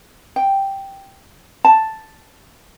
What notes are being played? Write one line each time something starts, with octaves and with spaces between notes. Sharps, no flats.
G5
A5